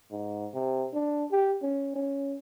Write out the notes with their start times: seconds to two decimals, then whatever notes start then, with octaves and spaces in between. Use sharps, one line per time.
0.11 G#2
0.54 C3
0.93 D4
1.31 G4
1.62 C#4
1.95 C#4